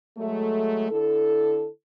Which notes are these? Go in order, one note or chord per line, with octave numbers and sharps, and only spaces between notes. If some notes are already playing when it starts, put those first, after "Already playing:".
F#3 G#3 A3
D3 E4 A4